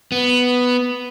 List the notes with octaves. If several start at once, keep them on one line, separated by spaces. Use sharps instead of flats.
B3